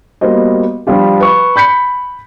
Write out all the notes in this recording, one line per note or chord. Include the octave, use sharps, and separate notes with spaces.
G3 A#3 B3 F#4 C5 D#5
F3 G3 D4 F4 G4
B4 C#6
B5 G6 B6 C#7